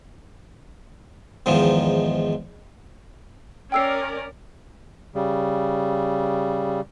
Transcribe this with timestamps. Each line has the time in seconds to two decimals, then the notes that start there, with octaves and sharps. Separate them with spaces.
1.46 E2 G#2 D#3 F3
3.72 C#4 A#4 D5 G5 E6 C7
5.15 C#3 G3